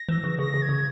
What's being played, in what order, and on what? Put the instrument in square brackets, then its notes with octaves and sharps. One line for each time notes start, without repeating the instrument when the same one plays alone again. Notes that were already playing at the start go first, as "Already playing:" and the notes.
Already playing: [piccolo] A#6
[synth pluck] E3
C#3
[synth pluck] C#3 [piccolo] A#6
[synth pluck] C#3
[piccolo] G#6
[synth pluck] C#3